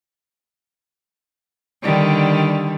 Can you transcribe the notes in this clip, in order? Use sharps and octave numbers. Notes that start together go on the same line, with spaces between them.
D3 D#3 G3